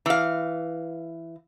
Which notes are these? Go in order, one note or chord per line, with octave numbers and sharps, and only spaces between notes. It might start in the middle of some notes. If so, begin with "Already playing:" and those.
E3 F5